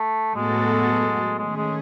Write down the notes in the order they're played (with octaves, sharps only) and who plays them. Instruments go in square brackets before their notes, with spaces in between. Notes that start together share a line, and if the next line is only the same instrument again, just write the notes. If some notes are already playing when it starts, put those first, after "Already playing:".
Already playing: [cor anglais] A3
[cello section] A2 F#3 B3 F#4 A4 [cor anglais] G#3
[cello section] D#3 A3 C#4 G#4 [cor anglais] G#3
[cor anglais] G#3